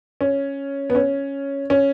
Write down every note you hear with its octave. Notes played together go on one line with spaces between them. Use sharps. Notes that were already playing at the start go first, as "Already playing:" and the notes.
C#4
B3
C#4
C#4